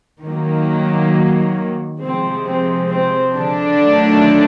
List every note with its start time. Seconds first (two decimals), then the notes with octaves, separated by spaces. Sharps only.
0.23 D#3 F#3 A#3
2.01 C3 F3 G#3 C4
2.46 C4
2.91 C4
3.35 D3 D4
3.80 D#3 F#3 A3